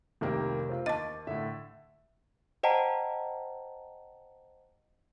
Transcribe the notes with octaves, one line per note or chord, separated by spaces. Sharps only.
F1 C2 D#3 A#3 G4 A#4
C4 F4
D#2 D#5 A5 D6 A6
A2 D3 E5
C5 D#5 F#5 G5 A5 A#5